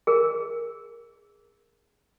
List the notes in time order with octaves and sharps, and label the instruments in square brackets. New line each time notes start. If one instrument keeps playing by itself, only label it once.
[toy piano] G#4 A#4